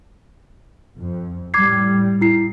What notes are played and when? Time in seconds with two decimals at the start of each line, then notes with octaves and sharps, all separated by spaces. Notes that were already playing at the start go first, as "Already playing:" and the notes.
0.97 F2
1.54 A2 G3 D6 G#6 C7
2.21 E4 C7